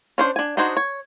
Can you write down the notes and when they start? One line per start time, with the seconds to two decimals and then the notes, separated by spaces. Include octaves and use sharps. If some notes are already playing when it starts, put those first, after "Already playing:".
0.18 C#4 D4 C5
0.36 D4 G#5
0.57 D4 D#4 F#4 G#4 C5
0.77 C#5